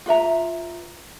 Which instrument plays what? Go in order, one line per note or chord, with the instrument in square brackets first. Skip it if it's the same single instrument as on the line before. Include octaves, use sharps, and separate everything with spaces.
[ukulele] F4 B4 E5 A#5